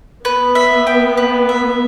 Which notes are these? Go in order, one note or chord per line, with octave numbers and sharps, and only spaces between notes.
B3 B4
E5
G5
B4
E5